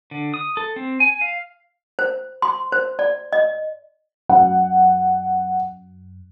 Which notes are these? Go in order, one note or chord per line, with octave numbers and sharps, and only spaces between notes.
D3
D#6
A4
C4
G#5
F5
C5
C6
C5
D5
D#5
F#2 F#5